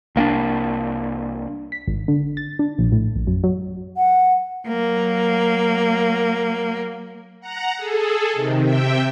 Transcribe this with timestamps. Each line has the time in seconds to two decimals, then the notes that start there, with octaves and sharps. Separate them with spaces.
0.16 C2 A#3 C4 D4
1.72 B6
1.88 G#1
2.08 D3
2.37 A6
2.59 D4
2.78 A#1
2.92 A2
3.16 A#1
3.27 F#2
3.44 F#3
3.97 F#5
4.68 F#3 A#3
7.40 F#5 A#5
7.77 G#4 A4
8.33 C3 D#3
8.62 C3 E5 G5